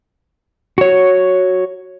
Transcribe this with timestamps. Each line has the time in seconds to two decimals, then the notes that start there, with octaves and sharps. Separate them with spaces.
0.78 F#4 C#5